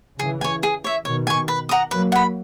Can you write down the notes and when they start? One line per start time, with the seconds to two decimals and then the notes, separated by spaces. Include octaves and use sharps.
0.19 C#3 E3 G#4
0.41 C#5 G#5
0.63 G#4
0.84 C#5 E5
1.05 B2 D#3 C#5
1.27 G#5 C#6
1.48 B4
1.69 F#5 A#5 D#6
1.91 F#3 A#3 B4
2.12 F#5 B5